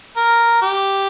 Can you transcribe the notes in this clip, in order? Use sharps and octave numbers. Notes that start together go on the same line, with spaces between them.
A#4
G4